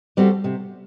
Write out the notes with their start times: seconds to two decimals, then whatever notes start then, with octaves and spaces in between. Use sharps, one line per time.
0.17 G3 C4 F#4 A4
0.44 C3